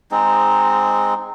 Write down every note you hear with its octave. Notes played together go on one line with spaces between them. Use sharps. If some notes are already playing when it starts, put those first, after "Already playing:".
G#3 C4 D#4